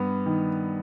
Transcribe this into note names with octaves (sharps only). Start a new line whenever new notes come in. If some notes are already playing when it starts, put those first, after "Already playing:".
Already playing: G2 B3
D#3